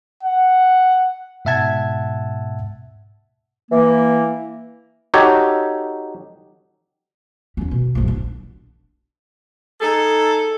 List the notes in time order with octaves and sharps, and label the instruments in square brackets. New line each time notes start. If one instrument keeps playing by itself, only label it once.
[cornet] F#5
[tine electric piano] G#2 B2 E5 F#5 A5 G#6
[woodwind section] E3 A#3
[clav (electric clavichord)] D#4 F#4 G4 A4 C#5
[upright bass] D#2 C#4
B2
A#1 F#2
D4
[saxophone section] D#4 G#4 A4